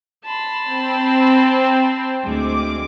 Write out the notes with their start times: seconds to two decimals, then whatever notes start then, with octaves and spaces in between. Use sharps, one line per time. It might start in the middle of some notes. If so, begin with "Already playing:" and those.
0.24 A5 B5 C6
0.65 C4
2.23 D2 G#3 D6